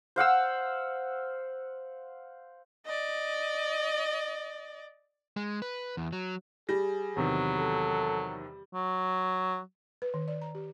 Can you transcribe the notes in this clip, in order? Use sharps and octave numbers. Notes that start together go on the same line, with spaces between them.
C5 F5 F#5 E6
D5 D#5
G#3
B4
E2
F#3
G3 G#4 A#6
E2 C3 D#3 F#3
A4
F#3
B4
D#3
D5
A#5
G4